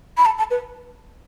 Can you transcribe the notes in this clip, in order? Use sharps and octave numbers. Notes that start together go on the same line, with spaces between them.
B5
A5
A5
B4